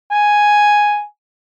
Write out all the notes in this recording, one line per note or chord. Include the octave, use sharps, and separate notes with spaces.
G#5